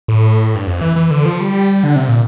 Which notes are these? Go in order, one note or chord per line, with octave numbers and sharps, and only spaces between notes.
A2
G2
F2
E3
E3
D3
F3
G3
D3
C3
A#2